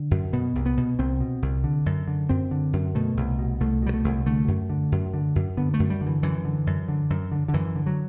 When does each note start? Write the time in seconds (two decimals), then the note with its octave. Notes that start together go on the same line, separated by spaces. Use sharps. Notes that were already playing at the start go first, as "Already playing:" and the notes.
Already playing: D3
0.11 F#2
0.33 B2 B3
0.55 C2
0.66 B3
0.77 B2
0.99 C2 C4
1.21 B2
1.42 C2
1.64 D3
1.86 F#2
2.08 D3
2.29 F#2 C4
2.51 D3
2.73 F#2
2.95 B2 A3
3.17 C2
3.39 B2
3.60 C2 A3
3.82 B2 G3
3.94 A3
4.04 C2
4.26 D3 A3
4.48 F#2
4.70 D3
4.92 F#2
5.14 D3
5.36 F#2
5.57 D3 B3
5.74 A3
5.79 F#2
5.90 G3
6.01 D3
6.06 E3
6.23 F#2 E3
6.45 D3
6.67 F#2
6.88 D3
7.10 F#2
7.32 D3
7.48 D3
7.54 F#2 E3
7.75 D3
7.86 F#3